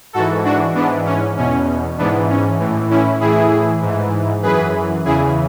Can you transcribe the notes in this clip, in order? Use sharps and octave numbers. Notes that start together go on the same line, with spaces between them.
G#2 E3 F#4 A4
D4 F#4
G#2 E3 B3 D4
C#4
E2 B2 C#4
G#2 E3 B3 D4
C#4
A2 E3
C#4 E4
A2 E3 E4 G#4
G#2
E3
F#2 E3 G#4 B4
E2 C#3 E3 E4 G#4